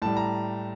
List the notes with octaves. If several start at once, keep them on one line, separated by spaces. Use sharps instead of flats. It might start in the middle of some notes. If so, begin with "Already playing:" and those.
A2 G3 A5
A#5